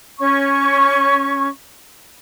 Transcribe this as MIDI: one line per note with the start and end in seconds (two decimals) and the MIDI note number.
0.19 1.47 61
0.19 1.47 85